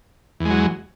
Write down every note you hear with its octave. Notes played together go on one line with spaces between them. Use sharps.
E2 F#3 G#3